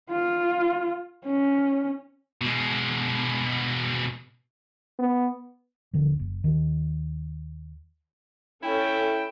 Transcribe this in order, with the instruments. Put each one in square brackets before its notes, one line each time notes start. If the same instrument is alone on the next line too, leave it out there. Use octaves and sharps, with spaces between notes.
[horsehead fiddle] F4
C#4
[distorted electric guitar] B2 G#3
[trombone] B3
[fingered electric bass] D#1 D3 F3
F#1
D#2 D#3
[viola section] C#4 A4 [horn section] E4 G5